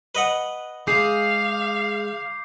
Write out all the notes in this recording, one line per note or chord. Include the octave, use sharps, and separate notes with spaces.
B4 D#5 F#5
G#3 G#4 F5 D6 G6 C7